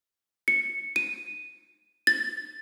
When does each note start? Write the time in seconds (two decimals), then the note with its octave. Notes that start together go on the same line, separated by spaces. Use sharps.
0.48 C#7
0.96 D#7
2.07 A6